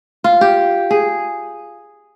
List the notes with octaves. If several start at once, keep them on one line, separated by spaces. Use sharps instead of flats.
F4
G4
G#4